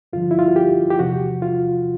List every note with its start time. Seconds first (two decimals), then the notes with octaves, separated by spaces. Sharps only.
0.13 G2 D3 F3 F4
0.31 E4
0.39 F4
0.48 F#4
0.56 G4
0.90 G4
0.99 E2 C3 F3 F#4
1.42 F4